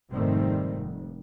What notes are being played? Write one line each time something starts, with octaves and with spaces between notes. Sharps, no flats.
F1 G#2 D#3 G3 A3 C4
F1